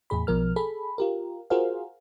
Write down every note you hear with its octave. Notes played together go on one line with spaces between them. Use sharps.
E2 A2 G#4 B5
B1 B2 F3 A#4 F6
G#4 A4 B5
F4 G4 A#4
F4 F#4 G#4 A#4 C5 F5